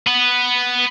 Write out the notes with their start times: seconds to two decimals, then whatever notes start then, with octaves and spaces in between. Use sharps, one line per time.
0.07 B3 B4